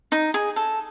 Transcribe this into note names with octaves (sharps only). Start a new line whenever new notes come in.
D#4
G#4
A4